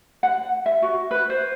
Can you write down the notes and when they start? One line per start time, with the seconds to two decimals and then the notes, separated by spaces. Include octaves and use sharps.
0.23 F#5
0.66 E5
0.82 F#4
1.11 B4
1.30 C5